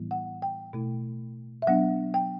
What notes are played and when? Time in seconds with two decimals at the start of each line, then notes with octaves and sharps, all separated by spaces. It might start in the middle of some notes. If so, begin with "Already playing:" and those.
Already playing: A2 E3 G3 B3 E4
0.11 F#5
0.42 G5
0.73 B2 A3 E4
1.62 E5
1.67 F#3 B3 D4 F#5
2.14 G5